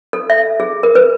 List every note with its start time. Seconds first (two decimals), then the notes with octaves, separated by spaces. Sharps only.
0.13 A4
0.30 E5
0.60 G#4
0.83 A#4
0.95 B4